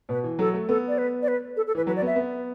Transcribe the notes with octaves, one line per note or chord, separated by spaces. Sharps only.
B2 B4
E3
F#3 A4
A3
B3 A4
D5
B4
D5
B4
A4
A4
E3 B4
F#3 B4
D5
B3 E5
B3